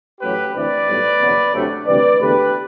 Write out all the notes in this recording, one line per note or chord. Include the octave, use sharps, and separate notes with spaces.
A1 A2 F#3 G4 B4
D2 C3 E3 B4 D5
B1 A2 G3
F#1 E2 B2 F#3
D2 C3 F#3 A3
D2 C3 E3 G3 B4 D5
E2 D3 A3 G4 B4